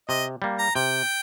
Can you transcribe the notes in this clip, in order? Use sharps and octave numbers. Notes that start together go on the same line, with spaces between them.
C3 D#5
G3 A#3
A#5
C3 G5